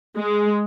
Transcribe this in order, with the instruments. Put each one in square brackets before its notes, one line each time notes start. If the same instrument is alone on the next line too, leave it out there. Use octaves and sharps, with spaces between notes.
[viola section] G#3